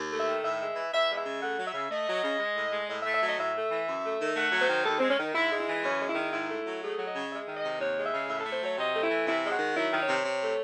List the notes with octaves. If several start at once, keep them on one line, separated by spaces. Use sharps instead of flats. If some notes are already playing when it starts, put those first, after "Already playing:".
Already playing: D#2
A3
E5
D#3
A2 E5
G#3
E3
E2 E5
G#3
E5
C#3
A3 F#5
F#3
E5
C#3
A3 D#5
F#3
C#3
G#3
A2
G#3
A2 D#5
E5
A3
E5
F#3 D#5
A2 E5
A3
E3
F#2
A3
D#3
A3 F#5
F#3
C5
D#3
D#2 A4
G#3 C4
C#4
D#3
G#2 E4
G#3
E4
E3
F#2 C#4
G#3
E4
D#3
G#2 E4
A3
F#3
A3 G#4
F#3
D#5
C#3
G#3 E5
D#3
D#5
C3
D#2 C#5
G#3
E5
C#3
A2 E5
A3 A4
C5
F#3 C#5
C3 D#5
A3
E4
E3
C3 E4
G#3
F#4
D#3
F#3 E4
D#3
C#5
C3
C3
A3